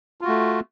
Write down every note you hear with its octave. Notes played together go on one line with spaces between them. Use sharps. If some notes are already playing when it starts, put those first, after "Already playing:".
A3 F4 F#4